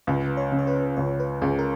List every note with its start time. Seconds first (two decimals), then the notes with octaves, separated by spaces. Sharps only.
0.07 C#2 B4
0.37 C#5
0.52 C#3
0.59 C#5
0.67 B4
0.97 C#2 C#5
1.20 B4
1.42 C#2 G#4
1.59 A#4